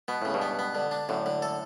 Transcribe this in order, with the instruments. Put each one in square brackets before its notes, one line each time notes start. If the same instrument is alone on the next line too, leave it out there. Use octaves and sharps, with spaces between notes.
[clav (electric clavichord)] B2 [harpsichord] B3
[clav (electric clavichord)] A2 [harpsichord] C#3
[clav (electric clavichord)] G2 B2
[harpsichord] B3
B3
D3
D4
[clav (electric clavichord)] F#2 A2 [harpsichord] D3
[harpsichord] D3
A4